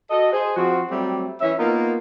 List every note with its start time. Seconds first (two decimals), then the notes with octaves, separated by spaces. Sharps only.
0.11 F#4 A4 D#5
0.32 G#4 C5
0.56 F3 C4 F#4
0.91 F#3 G3 A3 C4 G4
1.41 E3 C#4 E5
1.59 A#3 B3 D#4 F4 A#4